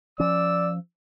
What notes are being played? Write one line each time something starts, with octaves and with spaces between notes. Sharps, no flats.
F3 C#4 D5 E6